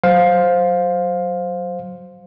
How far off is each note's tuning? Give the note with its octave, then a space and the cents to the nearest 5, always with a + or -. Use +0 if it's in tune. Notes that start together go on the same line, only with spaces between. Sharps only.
F#3 +5 C5 +0 F5 +15